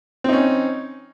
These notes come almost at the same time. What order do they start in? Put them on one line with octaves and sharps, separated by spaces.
C4 D#4 C#4